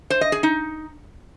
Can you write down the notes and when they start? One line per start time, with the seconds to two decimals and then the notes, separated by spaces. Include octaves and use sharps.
0.10 C5
0.21 D#5
0.32 G#4
0.43 D#4